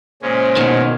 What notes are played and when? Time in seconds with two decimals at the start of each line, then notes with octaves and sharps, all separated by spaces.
0.22 E2 A#2 C#3 G#3 C#4 C5
0.56 B2 D#3